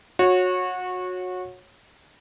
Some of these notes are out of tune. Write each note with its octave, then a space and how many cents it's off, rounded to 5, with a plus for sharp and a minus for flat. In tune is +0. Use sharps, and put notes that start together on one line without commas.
F#4 -25 C#5 -10